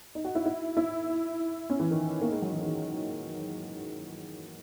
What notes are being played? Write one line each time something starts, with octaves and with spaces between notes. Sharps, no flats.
D#4
F#4
E4
E4
E4
C#4
E3
D#3
A#3
G#3
F#3
E3
D#3